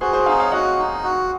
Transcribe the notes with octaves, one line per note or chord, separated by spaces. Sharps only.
F#4 G#4 C5
G#4 C5
D#4 F5 G#5
C#5 F5
F#4 D#5 F#5
D#4
F#4